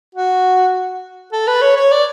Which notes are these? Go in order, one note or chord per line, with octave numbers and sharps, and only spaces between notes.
F#4
A4
B4
C#5
C#5
D5